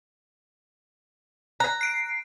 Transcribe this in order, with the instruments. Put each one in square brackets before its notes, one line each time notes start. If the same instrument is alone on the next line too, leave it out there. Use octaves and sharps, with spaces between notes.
[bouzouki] A#5 [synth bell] F#6
[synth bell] C7 D7